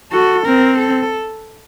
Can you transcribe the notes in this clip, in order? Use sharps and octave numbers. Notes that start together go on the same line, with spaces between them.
F#4 A4
C4 A#4
A4